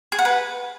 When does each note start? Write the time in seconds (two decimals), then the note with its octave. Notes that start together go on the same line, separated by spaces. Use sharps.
0.12 G#4
0.19 F#5
0.25 B4